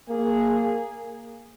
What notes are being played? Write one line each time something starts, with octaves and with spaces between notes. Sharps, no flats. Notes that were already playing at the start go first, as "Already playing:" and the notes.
A#3 G#4